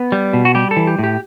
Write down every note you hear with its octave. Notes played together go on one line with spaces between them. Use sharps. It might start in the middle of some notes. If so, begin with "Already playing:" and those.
Already playing: B3
G3
B2
F#4
G3 G4
A4
E3
G4
A2 G4